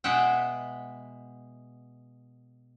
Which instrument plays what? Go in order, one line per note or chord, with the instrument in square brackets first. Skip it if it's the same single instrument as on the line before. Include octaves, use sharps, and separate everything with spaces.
[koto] B2 G#3 E5 F#5 G5